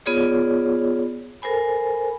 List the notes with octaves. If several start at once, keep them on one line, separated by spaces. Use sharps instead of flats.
B3 F4 G#4 C#5 D5
A4 A#4 C5 G#5 B5